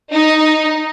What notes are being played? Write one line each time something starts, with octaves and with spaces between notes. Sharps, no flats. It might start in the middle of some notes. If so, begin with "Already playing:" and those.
D#4